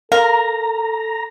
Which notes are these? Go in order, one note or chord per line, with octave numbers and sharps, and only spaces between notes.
A4 A#4 F5 A#5